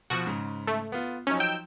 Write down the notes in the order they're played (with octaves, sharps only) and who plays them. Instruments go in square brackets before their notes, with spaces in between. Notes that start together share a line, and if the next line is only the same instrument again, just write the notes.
[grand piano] B2 F3 [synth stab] F#4
[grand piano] G#2 C#3
[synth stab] A3
[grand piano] B3 F4
[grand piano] F3 F#3 D#4 [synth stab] C#4
[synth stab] G5 E6 G6